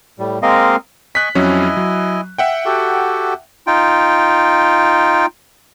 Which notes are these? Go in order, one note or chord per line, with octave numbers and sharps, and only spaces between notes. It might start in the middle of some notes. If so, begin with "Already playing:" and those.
A2 G3
G#3 A#3 C4 A#4 D#5 F5
D#5 G#5 C#6 F#6 B6
F2 F#3 C#4 E4 D#5 G#5
F#3
E5 F#5 G5
F#4 G4 A4
D#4 F4 G5